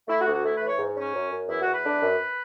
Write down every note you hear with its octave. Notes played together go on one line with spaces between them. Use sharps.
A3 E4
F#4
D2
F#4
A3 E4
B4
E3
C#5
G#2
C#4
F#2
F#2
E2 E4
F#4
E2
B4
D4
F#2